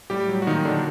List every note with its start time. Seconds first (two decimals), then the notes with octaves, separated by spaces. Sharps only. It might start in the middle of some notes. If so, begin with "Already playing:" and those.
0.10 A2 G3 G4
0.29 F#3
0.42 F#4
0.47 A#2 D#3 D#4
0.65 D3 F#3 D4